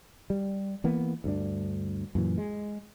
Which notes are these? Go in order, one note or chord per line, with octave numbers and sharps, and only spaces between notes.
G3
E3 A#3 B3
D2 G2 D4
F#2 A#2 E3
G#3